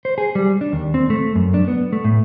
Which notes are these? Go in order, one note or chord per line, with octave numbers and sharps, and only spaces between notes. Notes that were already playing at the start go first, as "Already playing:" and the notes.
C5
G#4
G3
D4
D#2
C4
A3
F#2
D4
B3
A3
A2